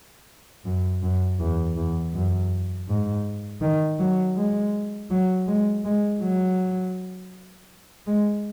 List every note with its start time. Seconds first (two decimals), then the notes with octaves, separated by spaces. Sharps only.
0.65 F#2
1.02 F#2
1.40 E2
1.76 E2
2.14 F#2
2.88 G#2
3.62 D#3
3.99 F#3
4.36 G#3
5.10 F#3
5.47 G#3
5.85 G#3
6.21 F#3
8.07 G#3